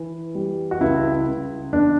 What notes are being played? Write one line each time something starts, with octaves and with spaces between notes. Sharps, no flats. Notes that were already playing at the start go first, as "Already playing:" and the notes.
Already playing: E3
G3
F#4
C#2 E4
C#2
E2 D4